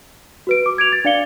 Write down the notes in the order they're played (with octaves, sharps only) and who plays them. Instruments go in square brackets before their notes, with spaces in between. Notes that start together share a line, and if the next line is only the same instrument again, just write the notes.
[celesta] F#4 B4 D7
D6
G#6 D7 F7
A6
D4 D5 F5 C#7 G7